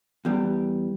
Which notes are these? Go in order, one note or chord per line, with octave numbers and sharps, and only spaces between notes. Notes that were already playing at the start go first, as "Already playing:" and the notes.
E2 G3